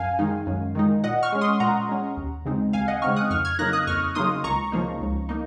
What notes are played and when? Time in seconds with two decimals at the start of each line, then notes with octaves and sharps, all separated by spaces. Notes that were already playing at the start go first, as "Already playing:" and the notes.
Already playing: F#2 F5 G#5
0.19 D#3 G#3 D#4
0.47 F#2
0.75 D#3 G#3 D#4
1.03 A#2 D#5 F#5
1.23 C#6 F6
1.32 G#3 C#4
1.41 C6 D#6
1.60 A#2 F#5 A#5
1.89 G#3 C#4
2.17 D#2
2.45 C#3 G#3 C4 D#4
2.73 D#2 F5 G#5
2.88 D#5 F#5
3.02 C#3 G#3 C4 D#4 C#6 F6
3.16 D#6 F#6
3.30 F2 C#6 F6
3.45 F6 G#6
3.59 C#3 F#3 A#3 D#4 F#6 A#6
3.73 D#6 F#6
3.87 F2 C#6 F6
4.15 C#3 F#3 A#3 D#4 C6 D#6
4.44 C#2 A#5 C#6
4.72 C#3 F3 A#3 D#4
5.01 C#2
5.29 A#3 D#4